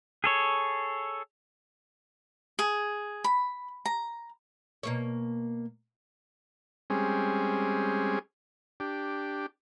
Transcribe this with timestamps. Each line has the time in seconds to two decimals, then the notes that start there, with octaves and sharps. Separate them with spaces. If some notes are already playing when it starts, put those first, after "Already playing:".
0.24 G#4 A4 C#5
2.59 G#4
3.24 B5
3.86 A#5
4.83 B2 A#3 C#5
6.90 G3 G#3 C4 C#4 G#4
8.80 D4 G4